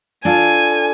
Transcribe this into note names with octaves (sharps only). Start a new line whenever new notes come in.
D4 F4 A4 G#5